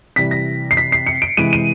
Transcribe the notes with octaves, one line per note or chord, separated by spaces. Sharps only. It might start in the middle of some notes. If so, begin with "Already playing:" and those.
C3 E3 G3 B6
A#6
C7
B6
C7
C#7
D7
C3 E3 G#3 D#7
D#7